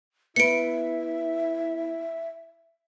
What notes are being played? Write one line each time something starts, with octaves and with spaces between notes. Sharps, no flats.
B3 E4 B4 E5 C#7 D7